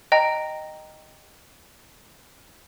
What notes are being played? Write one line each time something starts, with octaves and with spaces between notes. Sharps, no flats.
D#5 G5 A#5